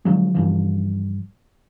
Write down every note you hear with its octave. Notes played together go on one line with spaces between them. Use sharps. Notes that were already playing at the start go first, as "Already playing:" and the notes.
D3 F3 F#3 G#3
G2 C#3 E3 F3